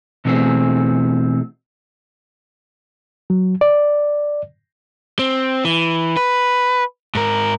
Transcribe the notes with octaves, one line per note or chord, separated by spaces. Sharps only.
B2 E3 A3 C4 F#4 G#4
F#3
D5
C4
E3
B4
G#2 A#4